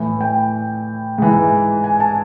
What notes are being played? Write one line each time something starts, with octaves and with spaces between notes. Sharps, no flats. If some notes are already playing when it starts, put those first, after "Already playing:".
Already playing: A2 E3
G5
G#2 E3
G#5
A5